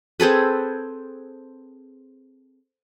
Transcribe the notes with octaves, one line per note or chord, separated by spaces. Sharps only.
C4 G#4 A4 B4